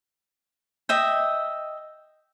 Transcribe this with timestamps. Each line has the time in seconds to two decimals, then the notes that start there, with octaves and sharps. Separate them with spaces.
0.89 D#5 E5 G5